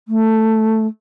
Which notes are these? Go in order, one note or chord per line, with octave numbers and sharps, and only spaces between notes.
A3